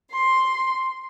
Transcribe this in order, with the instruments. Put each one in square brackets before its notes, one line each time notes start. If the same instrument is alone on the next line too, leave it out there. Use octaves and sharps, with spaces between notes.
[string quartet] C6